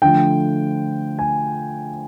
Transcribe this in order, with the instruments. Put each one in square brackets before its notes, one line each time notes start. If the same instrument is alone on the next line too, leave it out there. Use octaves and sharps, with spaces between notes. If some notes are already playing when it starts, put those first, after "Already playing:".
[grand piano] D3 F3 A3 G5
G#5